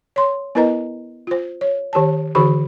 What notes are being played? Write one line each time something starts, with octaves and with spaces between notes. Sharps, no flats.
C#5 C6
B3 E4 A#4 B4 D#5 A#5
F4 C5
C#5
D#3 G4 C#5 A5
D3 E3 F#4 G#4 B5